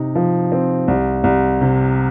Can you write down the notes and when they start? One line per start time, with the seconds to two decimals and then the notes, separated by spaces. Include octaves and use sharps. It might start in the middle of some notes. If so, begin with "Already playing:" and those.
Already playing: C3 D#4
0.15 F3
0.52 C4
0.88 C2
1.24 C2
1.61 C3